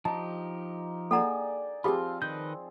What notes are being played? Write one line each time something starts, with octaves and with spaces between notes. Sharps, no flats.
F3 D#4 G4 A5
A#3 G#4 A4 D5 F#5 G5 A#5
F3 C4 F4 G4 G#4 B5
D#3 B4 D#5 G6